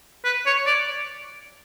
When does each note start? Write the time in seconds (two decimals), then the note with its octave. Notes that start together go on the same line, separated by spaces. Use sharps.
0.25 B4
0.46 C#5
0.66 D5